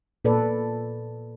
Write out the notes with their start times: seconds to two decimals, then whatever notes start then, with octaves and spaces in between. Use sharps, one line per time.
0.25 A#2 A4 B4 D5